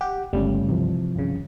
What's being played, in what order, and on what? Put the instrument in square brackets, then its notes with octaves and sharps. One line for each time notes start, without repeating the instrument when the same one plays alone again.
[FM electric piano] G4 [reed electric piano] F#5
[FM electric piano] G1 C#2 G3 [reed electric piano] A3 C#4
[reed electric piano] C3 E3 F3
[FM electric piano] G1 C#3